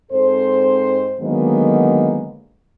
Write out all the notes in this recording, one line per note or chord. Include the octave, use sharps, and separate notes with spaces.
G#2 C4 A4 C5
D3 D#3 F#3 G#3 A#3 B3